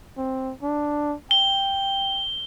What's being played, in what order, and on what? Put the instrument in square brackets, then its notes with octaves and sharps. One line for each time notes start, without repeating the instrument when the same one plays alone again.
[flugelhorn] C4
D4
[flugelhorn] G5 [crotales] G7